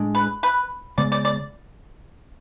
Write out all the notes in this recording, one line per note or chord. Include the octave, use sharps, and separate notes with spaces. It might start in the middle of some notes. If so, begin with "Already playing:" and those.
Already playing: A2 G#3 D4
B4
B4
C#3 G#3 B3 D5
D5
D5